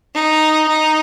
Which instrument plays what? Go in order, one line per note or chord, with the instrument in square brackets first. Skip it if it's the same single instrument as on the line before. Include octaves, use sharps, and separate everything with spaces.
[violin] D#4
D#4